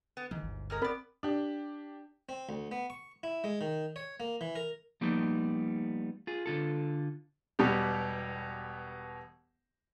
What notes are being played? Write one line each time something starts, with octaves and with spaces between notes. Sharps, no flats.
B3
G#2 D#3 E3 G3
G1 D2
F#2 G#3 A#4
B3 C4 A#4 D5 B5
D4 G4
C4
D2
B3
C#6
E4
G#3
D#3
C#5
A#3
E3
A#4
F3 G3 A#3 B3 D#4
F4 G#4
D3 F4 A4
E1 B2 G3 B3 G4